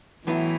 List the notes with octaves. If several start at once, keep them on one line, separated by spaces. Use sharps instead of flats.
A2 E3 F#3 B3 E4